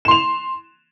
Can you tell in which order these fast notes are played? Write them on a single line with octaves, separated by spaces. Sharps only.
E7 C6 F7